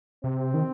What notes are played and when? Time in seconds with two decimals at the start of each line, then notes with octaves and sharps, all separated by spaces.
0.24 C3 C4
0.54 D#3